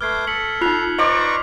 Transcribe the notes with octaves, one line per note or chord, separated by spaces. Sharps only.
A3 B4 D6 F6 G#6 C7
A4 B6 C#7 F#7
D#4 F4 F#6 C7 F7
B4 C5 D5 D#5 A#5 C#6 D6 F#7